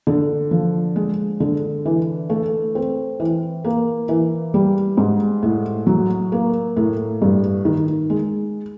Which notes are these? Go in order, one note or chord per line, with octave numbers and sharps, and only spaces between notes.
D3
F3
G#3
D3
E3
A3
C4
E3
A#3
E3
G3
G#2
A2
F#3
A#3
A2
G2
D#3
G#3